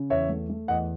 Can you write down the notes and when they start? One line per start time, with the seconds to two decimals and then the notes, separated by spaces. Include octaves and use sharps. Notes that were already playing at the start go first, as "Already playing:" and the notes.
Already playing: C#3
0.10 E2 C#5 E5
0.30 A3
0.49 A3
0.68 E2 D#5 F#5